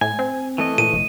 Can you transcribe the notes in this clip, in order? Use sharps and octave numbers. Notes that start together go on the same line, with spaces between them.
A2 G#5
C4
E3 A3 D#5
A#2 D#7
F1